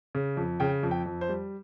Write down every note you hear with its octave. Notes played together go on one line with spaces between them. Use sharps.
C#3
F2
C#3 G5
F2
G5
F2
C5
G3